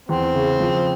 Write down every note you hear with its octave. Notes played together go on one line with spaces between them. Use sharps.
E2 C4
C#3
F3